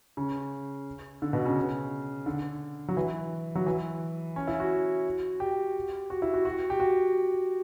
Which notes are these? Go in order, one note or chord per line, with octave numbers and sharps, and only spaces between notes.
C#3
D3
B2
C#3
D3
F#3
E3
F#3
E3
C#4
E4
F#4
G4
F#4
E4
F#4
F#4
G4
F#4